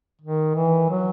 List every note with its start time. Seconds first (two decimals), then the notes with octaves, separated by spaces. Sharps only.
0.21 D#3
0.55 E3
0.90 F#3